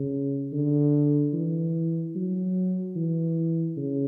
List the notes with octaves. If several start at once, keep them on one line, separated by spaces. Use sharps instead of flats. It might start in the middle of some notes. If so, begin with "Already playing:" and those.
Already playing: C#3
D3
E3
F#3
E3
C#3